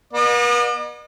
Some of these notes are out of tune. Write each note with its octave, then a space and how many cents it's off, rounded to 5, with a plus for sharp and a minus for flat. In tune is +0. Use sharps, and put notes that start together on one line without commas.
B3 -45 D#5 -40